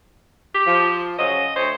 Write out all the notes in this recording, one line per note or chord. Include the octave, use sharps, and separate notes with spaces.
G4
F3
C#3 F#3 C5 D#5
D2 C5 C#5